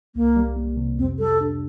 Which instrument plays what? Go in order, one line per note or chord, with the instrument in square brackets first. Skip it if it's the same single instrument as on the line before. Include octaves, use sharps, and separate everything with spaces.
[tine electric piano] C2 [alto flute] A#3
[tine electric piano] G3
A#3
C3
[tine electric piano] F2 [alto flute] C4
[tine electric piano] G3 [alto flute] A4
[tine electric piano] D4